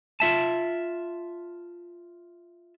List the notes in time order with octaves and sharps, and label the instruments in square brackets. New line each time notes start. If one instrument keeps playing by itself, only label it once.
[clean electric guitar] F4 E5 A5